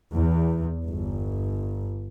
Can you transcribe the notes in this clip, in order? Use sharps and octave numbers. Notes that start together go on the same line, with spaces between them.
E2
G1